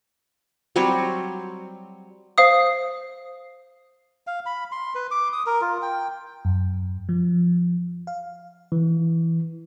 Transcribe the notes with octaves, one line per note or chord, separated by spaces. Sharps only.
F#3 G3 C4 C#5
C5 F5 D#6
F5
B5
C6
B4
D6
D#6
A#4
F4
G5
F#2
F3
F5
E3